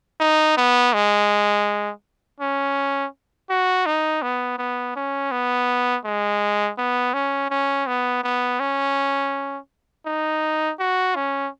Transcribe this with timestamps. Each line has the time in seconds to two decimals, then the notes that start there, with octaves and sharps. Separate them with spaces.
0.20 D#4
0.57 B3
0.93 G#3
2.40 C#4
3.50 F#4
3.86 D#4
4.22 B3
4.58 B3
4.96 C#4
5.31 B3
6.05 G#3
6.78 B3
7.13 C#4
7.51 C#4
7.87 B3
8.23 B3
8.60 C#4
10.06 D#4
10.80 F#4
11.15 C#4